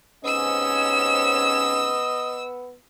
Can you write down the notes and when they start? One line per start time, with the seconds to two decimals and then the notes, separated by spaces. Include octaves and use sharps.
0.25 G#2 C3 B3 C#4 D#5 E6 E7